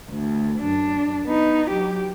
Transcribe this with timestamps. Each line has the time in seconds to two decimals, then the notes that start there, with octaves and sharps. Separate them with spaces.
0.11 D2
0.60 F#2 D4
1.26 B3 D#4
1.70 F#3 G4